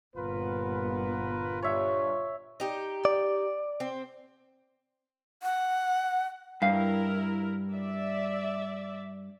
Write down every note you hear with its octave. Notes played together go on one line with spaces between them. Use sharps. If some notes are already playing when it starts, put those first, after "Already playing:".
G1 A#2 B3 F4 A#4 B4
G2 C#5 E5
D#4 G4
D5
C4
F#5
G2 E4 A#4 F5
D5 E5